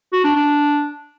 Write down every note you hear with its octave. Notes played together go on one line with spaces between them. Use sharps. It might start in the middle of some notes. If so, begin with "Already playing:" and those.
F#4
D4
D4